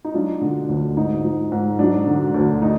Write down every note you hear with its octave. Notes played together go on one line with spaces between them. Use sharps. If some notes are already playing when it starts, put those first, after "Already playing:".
D#4
F#3 D4 F4
D3
D2
G#2 D#4
F3
G#2
F#3 D4
D3
D2
D#4